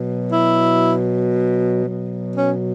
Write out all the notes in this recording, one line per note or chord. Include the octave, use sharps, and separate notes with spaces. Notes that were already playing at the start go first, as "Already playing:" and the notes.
Already playing: B2 F#3
E4
B2 F#3
C#4